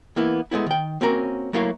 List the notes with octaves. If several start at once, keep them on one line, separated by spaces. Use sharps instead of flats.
E3 A#3 B3 E4
G#3 A3 B3 E4
D#3 G5
A#3 C4 C#4 F#4 A#4
F#3 A3 A#3 E4 C#5 F5